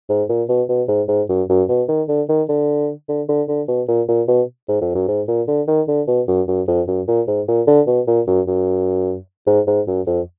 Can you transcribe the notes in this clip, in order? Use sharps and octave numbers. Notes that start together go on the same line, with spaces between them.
G#2
A#2
B2
B2
G#2
G#2
F#2
F#2
B2
D#3
D3
D#3
D3
D3
D3
D3
B2
A#2
A#2
B2
G#2
F2
F#2
G#2
A#2
D3
D#3
D3
B2
F#2
F#2
F2
F#2
A#2
G#2
A#2
D3
B2
A#2
F#2
F#2
G#2
G#2
F#2
F2